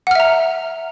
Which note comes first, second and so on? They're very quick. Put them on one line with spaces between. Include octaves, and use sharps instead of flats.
F#5 F6 E5 A#5